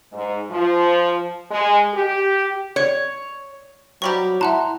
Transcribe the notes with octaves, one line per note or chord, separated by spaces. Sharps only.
G#2
F3
G#3
G4
C#5
C3 F#3 G3 G4 A#5 B5 C#6
E4 E5 F#5 A5 A#5 C6 F#6